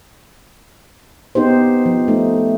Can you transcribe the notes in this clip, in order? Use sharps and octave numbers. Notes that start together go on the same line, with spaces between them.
B3 D#4 G4 C5
F3
A3 D#4